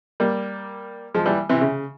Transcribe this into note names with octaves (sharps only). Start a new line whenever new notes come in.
G3 A#3
F3 G#3
E3 G3
C3 E3
C#3